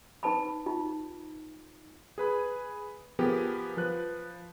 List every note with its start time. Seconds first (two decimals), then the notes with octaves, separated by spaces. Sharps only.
0.23 D#4 B4 A5 B5
0.66 D#4 F4
2.18 G#4 B4 B5
3.19 F3 B3 G4 G#4 A#4
3.77 F3 B4 F#6